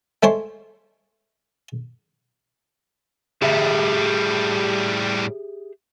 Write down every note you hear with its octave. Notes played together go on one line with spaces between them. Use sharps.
G#3 A3 C5 C#5 C6
A2 G3 G4 G#4 E5